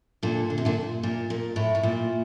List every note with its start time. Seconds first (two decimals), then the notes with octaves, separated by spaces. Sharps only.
0.23 A#2 D3
0.50 D3
0.58 C3
0.65 A#2 D3
1.03 A#2
1.30 A#2
1.56 A2
1.75 A2
1.83 A#2